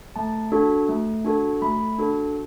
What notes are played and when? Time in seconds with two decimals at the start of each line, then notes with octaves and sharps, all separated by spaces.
0.16 A3 A5
0.52 D4 F#4 A4
0.89 A3
1.25 D4 F#4 A4
1.62 A3 B5
1.99 D4 F#4 A4